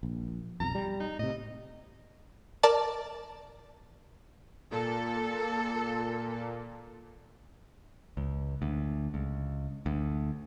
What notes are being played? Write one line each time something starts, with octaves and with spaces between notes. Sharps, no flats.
A#1
B1 F2 A#5
G3
D#4
A2 C3 D#5
A#4 D5 A5
A#2 A4
C#2
D2
C#2
D2